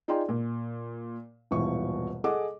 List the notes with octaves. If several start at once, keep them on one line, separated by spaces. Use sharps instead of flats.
D#4 F4 G#4 D5 G5 C6
A#2
D#1 G#1 B2 E3 C#6
G#4 A4 D#5 F#5 D6